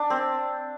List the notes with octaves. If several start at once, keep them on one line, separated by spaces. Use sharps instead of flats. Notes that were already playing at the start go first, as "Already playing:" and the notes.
Already playing: D4
C4